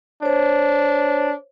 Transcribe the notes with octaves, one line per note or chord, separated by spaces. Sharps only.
D4 C5 C#5